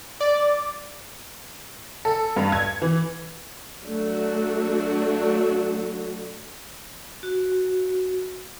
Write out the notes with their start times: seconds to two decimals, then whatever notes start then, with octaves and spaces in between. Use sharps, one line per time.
0.20 D5
2.05 A4
2.36 G2
2.52 G#6
2.82 E3
3.83 F#3 A3 D4 F#4
7.23 F#4